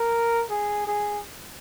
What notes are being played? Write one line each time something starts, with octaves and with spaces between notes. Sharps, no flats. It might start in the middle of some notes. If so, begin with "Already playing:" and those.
Already playing: A#4
G#4
G#4